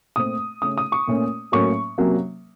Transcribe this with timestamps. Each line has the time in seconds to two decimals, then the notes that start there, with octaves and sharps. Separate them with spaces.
0.16 A#2 A3 C4 D#6
0.62 C#3 A3 C#4 D#6
0.78 D#6
0.92 C#6
1.08 A#2 A3 C#4
1.52 A2 F#3 A#3 C#4 C#6
1.98 C3 F#3 A#3 C#4